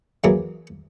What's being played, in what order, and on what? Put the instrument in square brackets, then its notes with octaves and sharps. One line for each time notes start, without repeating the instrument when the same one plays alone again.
[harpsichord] E3 F#3 A#3 G#4